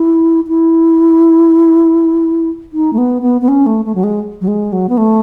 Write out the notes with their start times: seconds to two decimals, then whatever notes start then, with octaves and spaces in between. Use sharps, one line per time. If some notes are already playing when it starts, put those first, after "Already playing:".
Already playing: E4
0.48 E4
2.73 D#4
2.93 A3
2.98 B3
3.22 B3
3.41 B3
3.48 C#4
3.66 A3
3.85 A3
3.95 F#3
4.03 G#3
4.41 F#3
4.48 G#3
4.72 F#3
4.89 B3
4.97 A3